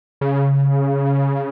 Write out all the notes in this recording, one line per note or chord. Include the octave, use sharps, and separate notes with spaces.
C#3